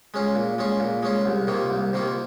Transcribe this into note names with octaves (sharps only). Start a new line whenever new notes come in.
G#3 C#4 F4
A#2
G#3 C#4 F4
A#2
G#3 C#4 F4
C2
C3 D#3 A#3 F4
C2
C3 D#3 A#3 F4